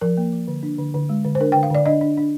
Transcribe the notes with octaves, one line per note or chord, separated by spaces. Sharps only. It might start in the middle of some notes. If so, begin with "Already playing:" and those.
F3 A#4
A#3
F3
D3
D4
D3
D3
G#3
D3
C5
D4 A#4
G5
D3
F5
D3 D5
D4 D#5
D4
D4